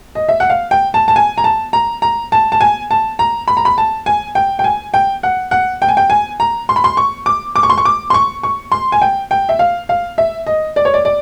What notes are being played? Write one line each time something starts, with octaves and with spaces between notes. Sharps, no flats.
D#5
E5
F#5
F5
G5
A5
A5
G#5
A#5
A5
A#5
A#5
A5
A5
G#5
A5
A#5
B5
A#5
B5
A5
G#5
G5
G5
G#5
G5
F#5
F#5
G5
G#5
G5
G#5
A#5
C6
B5
C6
C#6
D6
D6
C#6
C6
C#6
D6
C6
C#6
C#6
C6
G#5
G5
G5
E5
F5
F5
E5
D#5
D5
C#5
D5
D5